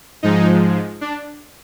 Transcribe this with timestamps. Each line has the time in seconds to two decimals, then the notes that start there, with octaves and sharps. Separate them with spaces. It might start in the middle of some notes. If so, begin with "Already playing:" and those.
0.23 G#2 F3 G#3 D#4
1.01 D4